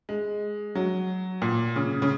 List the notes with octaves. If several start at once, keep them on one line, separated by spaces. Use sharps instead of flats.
G#3
F#3
A#2
C#3
C#3